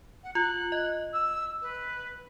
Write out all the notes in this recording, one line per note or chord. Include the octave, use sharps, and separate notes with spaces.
F#5
F4 F#6
D#5
E6
B4